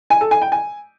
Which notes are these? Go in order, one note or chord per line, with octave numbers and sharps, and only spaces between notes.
G#5
A4
G#5
G5
G#5